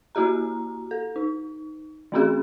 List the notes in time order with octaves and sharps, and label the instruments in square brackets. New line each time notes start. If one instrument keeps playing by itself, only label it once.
[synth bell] A#3 E4 F#4 G4 A#5
A4
D#4
E3 A3 C4 C#4 F#4 G#4